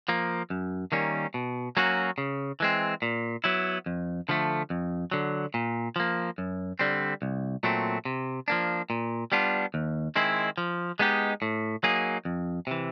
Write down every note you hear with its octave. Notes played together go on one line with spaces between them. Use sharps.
F3 A#3
F#2
D#3 G3 A#3 C#4
B2
F#3 A#3 C#4 F#4
C#3
E3 G#3 C4
A#2
F#3 B3 E4
F2
D3 F3 A3
F2
D3 F#3
A#2
F3 A#3
F#2
D3 G3 C4
C2
A#2 F#3 A3 C4
C3
F3 A#3 D4
A#2
G3 B3 D4 F4
D#2
D#3 G#3 C4 E4
F3
G#3 B3 D#4 G4
A2
F#3 A#3 D#4 G#4
F2
C3 E3